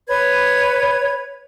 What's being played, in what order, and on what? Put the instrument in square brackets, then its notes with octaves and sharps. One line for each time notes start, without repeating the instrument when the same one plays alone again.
[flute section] B4 C#5 G#6